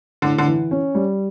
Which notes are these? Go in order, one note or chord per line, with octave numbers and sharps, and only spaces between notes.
A2 D3
D3
E3
C#4
G3